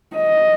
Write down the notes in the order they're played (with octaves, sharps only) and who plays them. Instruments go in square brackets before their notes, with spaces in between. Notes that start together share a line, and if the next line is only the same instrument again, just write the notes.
[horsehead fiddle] D#5